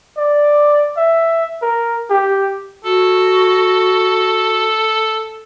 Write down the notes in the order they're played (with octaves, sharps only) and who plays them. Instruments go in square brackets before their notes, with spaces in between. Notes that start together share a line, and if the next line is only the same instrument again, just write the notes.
[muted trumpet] D5
E5
A#4
G4
[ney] F#4 [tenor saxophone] A4